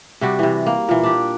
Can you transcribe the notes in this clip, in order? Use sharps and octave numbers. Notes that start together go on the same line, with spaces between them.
C3 G3 F#4
C3 E3
A#3
A#2 E3
D4 G4